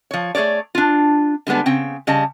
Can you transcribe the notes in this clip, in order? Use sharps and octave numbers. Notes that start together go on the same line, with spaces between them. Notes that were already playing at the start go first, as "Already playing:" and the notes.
F3 C#5
A3 G#4 A#4 C#5 D5
D4 F4
D3 G3 G#3 B3 D4
C#3 C4 G5
C#3 G3 D#5 A5